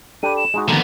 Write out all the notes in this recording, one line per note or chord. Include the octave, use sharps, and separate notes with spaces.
D4 G4 A4 B5 D#7
E7
G#3 D#4 F#4 G#4
D3 D#3 F3 A#3 B3 A#5